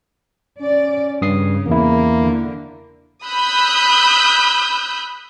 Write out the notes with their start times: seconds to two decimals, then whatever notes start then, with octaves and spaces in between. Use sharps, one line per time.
0.61 C#4 D5
1.22 G2 C#3 D#6 C7
1.67 E2 A#3 E4
2.20 D3
3.25 B5 D#6 E6 F#6 G6 B6